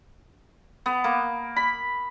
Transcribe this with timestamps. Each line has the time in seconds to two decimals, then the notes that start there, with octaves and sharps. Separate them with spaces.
0.86 B3
1.04 A#3
1.56 B5